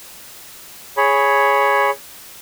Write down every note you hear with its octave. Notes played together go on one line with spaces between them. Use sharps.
G#4 C#5 B5